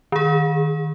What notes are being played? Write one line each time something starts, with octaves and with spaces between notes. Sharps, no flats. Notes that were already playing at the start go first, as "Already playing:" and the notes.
D#3 G#4